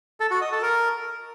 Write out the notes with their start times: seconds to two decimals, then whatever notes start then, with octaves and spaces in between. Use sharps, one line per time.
0.20 A4
0.31 F#4
0.41 D#5
0.52 A4
0.62 A#4